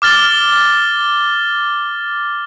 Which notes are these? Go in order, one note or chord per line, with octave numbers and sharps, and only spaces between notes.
D6 F6 A6 G7